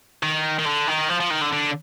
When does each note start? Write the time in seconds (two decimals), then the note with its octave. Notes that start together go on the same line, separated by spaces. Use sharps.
0.23 D#3
0.59 D#3
0.66 D3
0.88 D#3
1.09 F3
1.20 F3
1.31 D#3
1.42 D3
1.53 D3